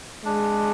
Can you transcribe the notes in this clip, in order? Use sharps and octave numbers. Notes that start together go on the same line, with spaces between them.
G#3 D4